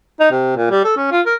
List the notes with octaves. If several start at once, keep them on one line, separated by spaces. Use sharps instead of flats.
D#4
C3
A#2
G3
A4
C#4
F4
A#4